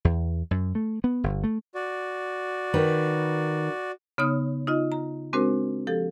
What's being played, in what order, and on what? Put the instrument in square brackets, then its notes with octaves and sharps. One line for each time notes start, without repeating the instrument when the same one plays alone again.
[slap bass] E2
F#2
A3
B3
G1
A3
[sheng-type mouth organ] F#4 D5
[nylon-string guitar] D#3 B4
[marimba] C#3 B3 D#4 C#5 D#6 F6
D#4 F4 D#5
A#5
G#3 C4 D4 F#4 A#4 C5
F3 G4 A4